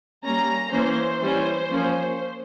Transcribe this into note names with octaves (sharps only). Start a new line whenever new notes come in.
G3 A#3 C#4 A#5
E3 A#3 C#4 C5
E3 G3 C#4 C5
F3 A#3 C#4